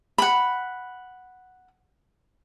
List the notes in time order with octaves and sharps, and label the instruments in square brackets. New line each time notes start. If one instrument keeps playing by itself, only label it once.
[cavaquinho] F#5 B5